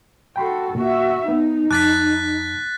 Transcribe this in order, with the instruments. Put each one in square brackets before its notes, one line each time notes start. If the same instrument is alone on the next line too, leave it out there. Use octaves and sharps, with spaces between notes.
[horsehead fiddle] F#4 A4 [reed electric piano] G5 B5 C6
[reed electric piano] A#2 [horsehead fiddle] F#4 E5
[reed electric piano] B3 [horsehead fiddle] D#4
[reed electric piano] F2 A5 D6 [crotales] F#6 A6 B6